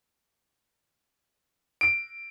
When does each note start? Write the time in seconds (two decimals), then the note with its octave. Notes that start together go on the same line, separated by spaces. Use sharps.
1.81 D7